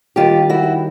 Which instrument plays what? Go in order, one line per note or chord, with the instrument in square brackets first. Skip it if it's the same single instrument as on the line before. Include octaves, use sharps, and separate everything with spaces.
[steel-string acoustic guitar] D#2 D#3 G3 F4 G4
E4 F#4